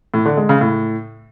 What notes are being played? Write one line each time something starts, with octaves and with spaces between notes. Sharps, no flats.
A2
D3
G#3
C#3
A2